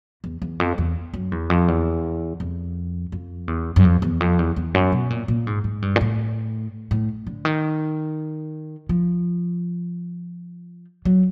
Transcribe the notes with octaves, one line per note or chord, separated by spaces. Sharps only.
E2
E2
F2
E2
F#2
E2
F2
E2
F2
F2
E2
F#2
F2
E2
F2
E2
E2
F#2
B2
A#2
A#2
G#2
G#2
G2
A#2
A2
A2
D3
D#3
F3
F#3